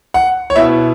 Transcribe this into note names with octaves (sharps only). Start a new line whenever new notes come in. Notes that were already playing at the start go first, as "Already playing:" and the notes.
F#5
C#5
B2 B3 E4 E5